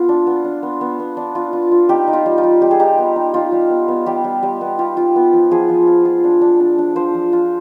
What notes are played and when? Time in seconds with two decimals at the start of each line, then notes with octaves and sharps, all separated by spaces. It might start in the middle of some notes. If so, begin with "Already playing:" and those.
Already playing: B3 F4
0.09 D4
0.27 B3
0.44 D4
0.63 B3
0.81 B3
0.99 B3
1.17 D4
1.35 F4
1.53 F4
1.71 F4
1.89 D#4 G4
2.07 D#4
2.13 F4
2.26 G3
2.38 F4
2.43 G3
2.62 D#4 G4
2.71 G#4
2.80 D#4 G4
2.98 B3
3.16 D#4
3.34 D#4 F4
3.52 G3
3.70 B3
3.88 B3
4.06 G3 G4
4.24 G3
4.43 G3
4.61 B3
4.79 F4 G4
4.97 F4
5.16 B3
5.33 F3
5.51 F3 G#4
5.69 F3
5.87 F4
6.05 F4
6.24 D4
6.41 D4
6.60 D4
6.78 D4
6.96 F3 C5
7.14 F3
7.33 F4